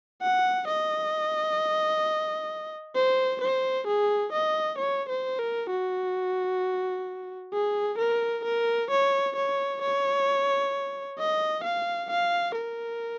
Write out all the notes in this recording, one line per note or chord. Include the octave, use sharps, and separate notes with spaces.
F#5
D#5
C5
C5
G#4
D#5
C#5
C5
A#4
F#4
G#4
A#4
A#4
C#5
C#5
C#5
D#5
F5
F5
A#4